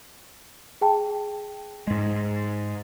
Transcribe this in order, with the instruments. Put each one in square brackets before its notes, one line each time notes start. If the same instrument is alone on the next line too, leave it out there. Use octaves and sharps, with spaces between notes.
[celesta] G#4 G5 A5
[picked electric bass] G#2 G#3